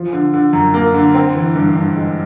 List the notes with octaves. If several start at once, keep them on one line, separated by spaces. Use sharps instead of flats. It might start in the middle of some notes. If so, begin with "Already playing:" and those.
Already playing: F3
D3
D3
F#2
A#3
D3
C4
E3
G2
G2
G#3